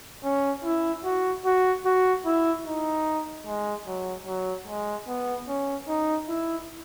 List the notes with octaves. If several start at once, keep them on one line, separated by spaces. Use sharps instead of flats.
C#4
E4
F#4
F#4
F#4
E4
D#4
G#3
F#3
F#3
G#3
B3
C#4
D#4
E4